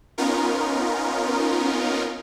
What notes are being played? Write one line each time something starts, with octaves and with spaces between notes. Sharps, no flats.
B3 C#4 D#4 F4 A#4